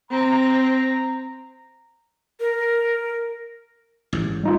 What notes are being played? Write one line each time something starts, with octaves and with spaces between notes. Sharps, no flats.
C4 A#5
A#4
A1 G#2
G3 D#4 F4